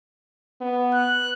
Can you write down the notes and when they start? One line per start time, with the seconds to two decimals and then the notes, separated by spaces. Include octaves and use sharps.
0.61 B3
0.94 F#6